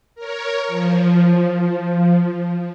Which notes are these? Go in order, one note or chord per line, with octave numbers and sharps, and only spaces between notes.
A#4 C#5
F3